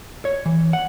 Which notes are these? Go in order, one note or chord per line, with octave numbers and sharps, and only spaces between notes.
C#5
E3
F#5